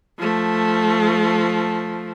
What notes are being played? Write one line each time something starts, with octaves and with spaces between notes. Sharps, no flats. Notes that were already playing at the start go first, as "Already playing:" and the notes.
F3 A3